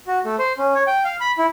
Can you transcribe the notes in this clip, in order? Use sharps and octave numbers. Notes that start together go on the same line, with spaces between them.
F#4
A3
C5
C#4
C#5
G5
F5
B5
E4